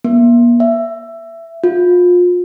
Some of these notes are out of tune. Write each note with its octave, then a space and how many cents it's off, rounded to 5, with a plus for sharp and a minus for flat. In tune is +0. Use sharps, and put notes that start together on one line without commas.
A#3 +45
E5 +15
F4 +30